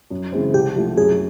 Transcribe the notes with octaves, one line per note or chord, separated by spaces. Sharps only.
F#2
C#3 E3 G#3 C4
C2 G4
C3 F3 A3
F#2 G#4